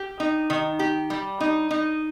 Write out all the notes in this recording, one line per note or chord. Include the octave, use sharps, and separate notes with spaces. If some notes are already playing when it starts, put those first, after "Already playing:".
Already playing: G4
D#4
D#3
G4
G3
D#4
D#4